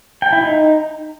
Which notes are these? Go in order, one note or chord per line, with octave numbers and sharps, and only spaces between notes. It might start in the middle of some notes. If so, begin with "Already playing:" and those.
G5
E4
D#4